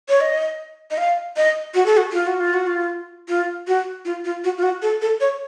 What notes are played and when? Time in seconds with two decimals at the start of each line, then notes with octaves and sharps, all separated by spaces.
0.09 C#5
0.21 D#5
0.91 D#5
0.98 F5
1.37 D#5
1.74 F#4
1.86 A4
1.97 F#4
2.12 F4
2.27 F#4
2.40 F4
2.54 F#4
2.67 F4
3.29 F4
3.68 F#4
4.05 F4
4.25 F4
4.44 F#4
4.58 F4
4.63 F#4
4.82 A4
5.02 A4
5.21 C#5